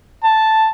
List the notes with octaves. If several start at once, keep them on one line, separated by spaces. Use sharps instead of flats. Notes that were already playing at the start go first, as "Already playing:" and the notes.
A5